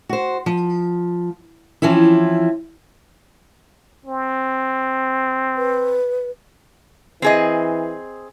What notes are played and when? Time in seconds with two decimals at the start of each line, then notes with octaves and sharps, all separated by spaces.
0.09 F#4 C5
0.46 F3
1.82 E3 F3 C4 C#4 E4
4.06 C4
5.57 B4
7.22 E3 C4 G#4 D#5